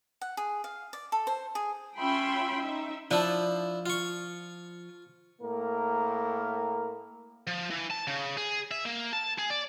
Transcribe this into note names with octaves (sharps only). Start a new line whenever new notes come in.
F#5
G#4
F5
D5
A4
C5
G#4
C#4 F4 E5 G5 B5 C6
D#4 E5
F3 D4 E4
F4 C#6
A2 A#3 A#4
F3
E3
A5
C#3
G#4
E5
A#3
A5
G#4
D5